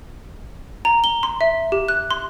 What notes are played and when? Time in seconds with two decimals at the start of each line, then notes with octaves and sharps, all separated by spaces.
0.85 A#5
1.04 G7
1.23 C6
1.41 E5
1.72 G4
1.89 F#6
2.11 C6